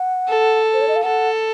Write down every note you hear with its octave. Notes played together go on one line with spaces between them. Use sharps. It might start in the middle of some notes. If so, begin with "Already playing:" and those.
Already playing: F#5
A4
C5
C#5
D#5
F5
A4 F#5